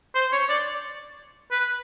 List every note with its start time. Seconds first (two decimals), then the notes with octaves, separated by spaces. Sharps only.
0.15 C5
0.32 C#5
0.49 D5
1.51 B4